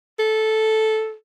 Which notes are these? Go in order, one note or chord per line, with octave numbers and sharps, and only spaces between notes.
A4